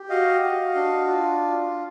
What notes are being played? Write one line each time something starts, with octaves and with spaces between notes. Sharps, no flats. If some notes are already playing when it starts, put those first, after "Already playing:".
Already playing: G4
F#4 D#5 F5
F#4
D4
F4